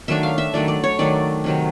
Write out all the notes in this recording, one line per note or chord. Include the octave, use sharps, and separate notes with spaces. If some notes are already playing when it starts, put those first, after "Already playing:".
D#3 F#3 A3 D4 E5
F5
E5
D#3 F#3 A3 D4 D5
D5
C#5
D#3 F#3 A3 D4 D5
C3 D#3 F#3